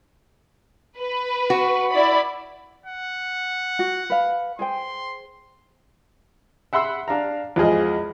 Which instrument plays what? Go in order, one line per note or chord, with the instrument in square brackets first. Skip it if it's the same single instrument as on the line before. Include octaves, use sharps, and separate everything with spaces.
[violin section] B4
[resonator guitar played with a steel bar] F#4
[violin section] E4 D5 B5
[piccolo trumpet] F#5
[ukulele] F#4
B4 F5
[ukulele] G#4 C5 G5 [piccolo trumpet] C6
[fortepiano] E5 F#5 B5 C6 E6
D4 F5 A#5
E2 F3 G#3 G#4 D#5